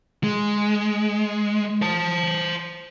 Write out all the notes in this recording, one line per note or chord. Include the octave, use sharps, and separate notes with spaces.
G#3
C5 A5